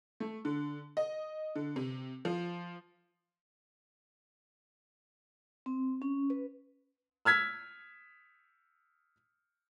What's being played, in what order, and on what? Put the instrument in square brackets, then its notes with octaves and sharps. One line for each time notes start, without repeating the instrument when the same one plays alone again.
[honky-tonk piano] A3
D3
D#5
D3
C3
F3
[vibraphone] C4
C#4
B4
[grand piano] E6 F6 G#6 B6